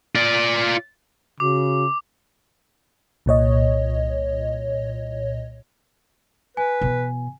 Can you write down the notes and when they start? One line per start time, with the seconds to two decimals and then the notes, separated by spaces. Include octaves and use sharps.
0.15 F4 D5
1.40 C#3 F#4 D6
3.26 C2 A#2 C#5 D#5
6.57 B4 G#5
6.81 B2 E3